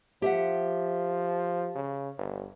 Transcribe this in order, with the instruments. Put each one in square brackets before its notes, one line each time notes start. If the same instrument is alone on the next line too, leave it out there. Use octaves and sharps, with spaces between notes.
[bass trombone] F3 [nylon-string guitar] G4 E5 F#5
[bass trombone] C#3
G1